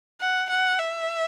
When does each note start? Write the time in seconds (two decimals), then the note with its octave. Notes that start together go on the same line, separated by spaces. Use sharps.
0.21 F#5
0.50 F#5
0.78 E5